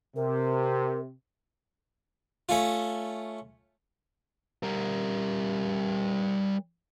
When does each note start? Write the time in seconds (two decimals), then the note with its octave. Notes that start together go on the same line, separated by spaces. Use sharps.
0.16 C3 A#4
2.49 A3 C#4 F4
4.63 G3 A#4